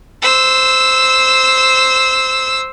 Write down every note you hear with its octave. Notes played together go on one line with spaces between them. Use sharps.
C5 E6